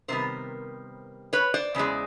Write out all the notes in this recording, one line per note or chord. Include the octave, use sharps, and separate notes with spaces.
C3 D#3 G3 B3 A#4 C5
B4 C#5
C5 D5
E2 C#3 E3 G#3